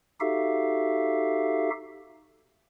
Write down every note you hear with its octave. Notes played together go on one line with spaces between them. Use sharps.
D#4 F#4 G4 A4 E5 F5